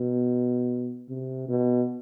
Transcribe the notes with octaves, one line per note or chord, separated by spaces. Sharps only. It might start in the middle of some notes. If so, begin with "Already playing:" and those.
Already playing: B2
C3
B2